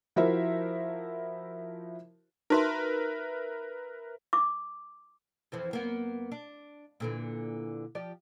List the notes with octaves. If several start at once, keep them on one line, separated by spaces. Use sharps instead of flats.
F3 E4 F#4 A#4 C5 E5
D#4 F#4 A#4 B4 E5 C6
D6
F2 E3 F3
F#2 A#3 B3
D4
A#2 D3 E3
F3 G4 D5